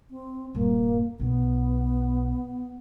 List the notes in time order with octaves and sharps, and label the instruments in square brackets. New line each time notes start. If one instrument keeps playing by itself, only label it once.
[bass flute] C4
[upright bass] D#1 G2 [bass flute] A#3
[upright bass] B1 B2 [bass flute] B3